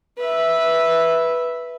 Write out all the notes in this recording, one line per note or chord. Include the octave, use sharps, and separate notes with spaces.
B4 E5